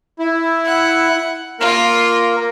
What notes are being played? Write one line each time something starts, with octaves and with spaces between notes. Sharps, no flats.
E4
F#5
A#3 F4 A#4